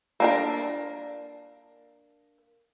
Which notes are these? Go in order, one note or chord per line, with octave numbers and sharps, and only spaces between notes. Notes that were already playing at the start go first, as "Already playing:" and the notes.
A#3 D4 A#4